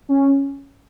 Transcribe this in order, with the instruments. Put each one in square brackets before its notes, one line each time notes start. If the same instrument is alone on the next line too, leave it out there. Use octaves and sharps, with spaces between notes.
[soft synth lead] C#4